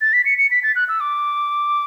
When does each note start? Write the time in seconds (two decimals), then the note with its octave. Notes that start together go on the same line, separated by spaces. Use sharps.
0.01 A6
0.13 B6
0.25 C#7
0.38 C#7
0.51 B6
0.63 A6
0.76 F#6
0.89 E6
1.00 D6